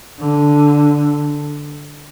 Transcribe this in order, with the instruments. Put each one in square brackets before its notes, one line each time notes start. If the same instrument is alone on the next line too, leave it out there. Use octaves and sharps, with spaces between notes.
[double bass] D3